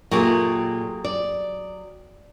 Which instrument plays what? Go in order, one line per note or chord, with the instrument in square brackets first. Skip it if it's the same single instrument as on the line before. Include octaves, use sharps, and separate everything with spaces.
[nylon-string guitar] A#2 A3 [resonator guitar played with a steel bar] F#3 G4 G#4
[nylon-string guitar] D5